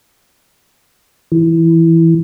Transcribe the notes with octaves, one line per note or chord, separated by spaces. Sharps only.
E3